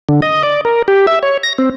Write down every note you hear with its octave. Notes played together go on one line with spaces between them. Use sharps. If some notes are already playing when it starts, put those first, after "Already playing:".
D3
D#5
D5
A#4
G4
E5
C#5
A#6
C4